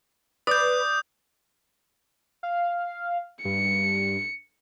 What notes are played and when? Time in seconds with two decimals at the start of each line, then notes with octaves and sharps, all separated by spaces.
0.47 B4 D5 D#6 G6
2.43 F5
3.45 G2 C#7